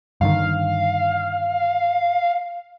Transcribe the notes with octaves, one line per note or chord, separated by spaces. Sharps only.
G2 D3 D#3 F5